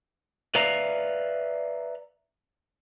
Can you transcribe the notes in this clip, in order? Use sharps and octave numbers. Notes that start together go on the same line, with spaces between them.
B4 D5 E5 F5 A#5